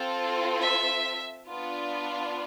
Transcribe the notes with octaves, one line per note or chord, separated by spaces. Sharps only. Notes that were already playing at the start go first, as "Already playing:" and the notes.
Already playing: C4 F4 A4
E5
B3 D4 F4